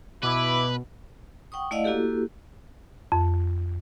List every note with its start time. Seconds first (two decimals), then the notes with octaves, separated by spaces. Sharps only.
0.23 B2 E4 B4 D6
1.52 F#5 G5 C#6 D#6
1.71 A3 E4 D5 D#5 F5 F#5
1.84 A#3 E4 F#4 G4 A4
3.12 F2